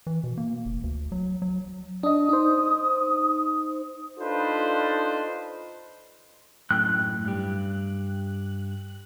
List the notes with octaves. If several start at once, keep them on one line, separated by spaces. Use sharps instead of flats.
E3
B2
A#3
F1
D2
F#3
F#3
D4 D#5 D#6
D#4 C5
D4 D#4 F4 A4 B4 C5
F#2 A2 G5 F#6
G2 G4